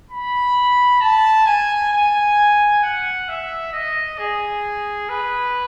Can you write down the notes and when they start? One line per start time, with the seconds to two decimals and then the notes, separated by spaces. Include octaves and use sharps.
0.11 B5
1.01 A5
1.46 G#5
1.93 G#5
2.83 F#5
3.28 E5
3.73 D#5
4.18 G#4
5.09 B4